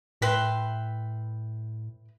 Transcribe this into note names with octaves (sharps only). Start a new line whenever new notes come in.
A2 B4 E5 G5 C6